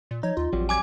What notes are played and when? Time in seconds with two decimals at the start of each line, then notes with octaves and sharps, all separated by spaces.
0.11 A#2
0.23 F3 D#4 C#5
0.37 D#2 F4
0.53 A1 F2 F#3 G3
0.69 G#5 D6 G#6